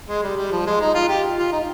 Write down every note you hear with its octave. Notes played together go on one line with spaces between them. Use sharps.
G#3
G3
G3
F3
G#3
D#4
F4
G4
F4
D#4